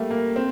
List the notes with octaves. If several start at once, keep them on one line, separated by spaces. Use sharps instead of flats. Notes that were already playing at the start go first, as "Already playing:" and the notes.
Already playing: G3 A3 A#3
A#3
C4